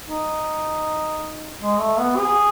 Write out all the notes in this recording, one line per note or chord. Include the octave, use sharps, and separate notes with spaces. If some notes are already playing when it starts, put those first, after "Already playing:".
D#4
G#3
A3
B3
G#4